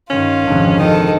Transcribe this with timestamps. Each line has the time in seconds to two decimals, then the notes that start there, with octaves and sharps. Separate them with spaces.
0.10 G2 D#3 C#4 F4
0.47 G#1 F2 C3 D4
0.79 D#3 A4 D#5